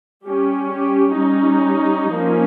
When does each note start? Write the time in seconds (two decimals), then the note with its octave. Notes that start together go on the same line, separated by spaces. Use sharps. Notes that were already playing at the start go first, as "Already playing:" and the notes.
0.25 G3 C#4 G4
0.72 G4
1.18 G3 C#4 D#4
2.12 F3 A#3 C#4